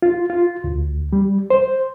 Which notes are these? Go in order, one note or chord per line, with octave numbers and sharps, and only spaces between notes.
F4
F4
D2
G3
C5